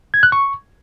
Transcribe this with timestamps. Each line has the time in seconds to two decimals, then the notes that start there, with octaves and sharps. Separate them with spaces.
0.14 G#6
0.23 F#6
0.32 C#6